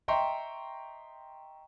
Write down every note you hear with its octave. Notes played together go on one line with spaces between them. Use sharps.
D#5 E5 G5 A#5 C6 C#6